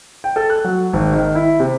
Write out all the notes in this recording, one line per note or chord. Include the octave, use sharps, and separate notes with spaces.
G5
A4
F#6
F#3
G#1
D#3
E4
C3